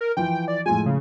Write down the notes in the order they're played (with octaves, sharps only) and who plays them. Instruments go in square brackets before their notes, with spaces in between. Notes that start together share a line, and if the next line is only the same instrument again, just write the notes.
[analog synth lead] A#4
[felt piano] E3 F3 [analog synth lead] G5
[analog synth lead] D5
[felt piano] A2 F3 G#3 [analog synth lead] G#5
[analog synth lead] C#3